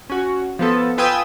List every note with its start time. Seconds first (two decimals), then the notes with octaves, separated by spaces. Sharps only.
0.10 C#4 F#4
0.59 F3 B3 A4
0.98 F4 B4 G5 G#5 D#6 E6